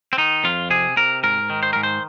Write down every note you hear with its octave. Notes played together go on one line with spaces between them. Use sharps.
C4
D#3 D#4
F2 F4
C3 G#4
C3 A#4
G#2 A#4
D#3
C5
G#2 A#4
C5